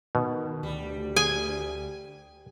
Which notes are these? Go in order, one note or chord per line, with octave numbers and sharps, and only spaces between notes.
B2 D#3
D2 G3
G#4 G#5